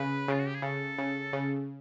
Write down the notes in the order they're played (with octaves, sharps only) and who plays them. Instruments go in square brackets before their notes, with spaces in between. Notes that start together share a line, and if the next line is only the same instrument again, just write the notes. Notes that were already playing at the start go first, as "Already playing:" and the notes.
Already playing: [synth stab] C#3 [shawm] B4
[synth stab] C#3 [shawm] F4
[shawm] F#4
G4
G#4
[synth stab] C#3 [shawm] A4
[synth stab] C#3
C#3